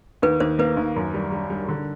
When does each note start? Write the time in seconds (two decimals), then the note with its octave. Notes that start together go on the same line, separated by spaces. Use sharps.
0.22 D#2 B4
0.40 D#2 C5
0.59 A#3 B4
0.77 D#2
0.96 F#2
1.14 G3
1.32 G3
1.50 G3
1.68 D3